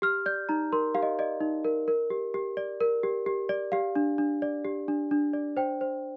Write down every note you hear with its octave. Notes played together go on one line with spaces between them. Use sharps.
G4 F6
D5 G6
D#4 A#5
A#4 C6
G4 F5
D#5
D5 D#5
D#4
A#4
A#4
G4
G4
D5
A#4
G4
G4
D5
G4 F5
D4
D4
D5
G4
D4
D4
D5
C5 G5
C5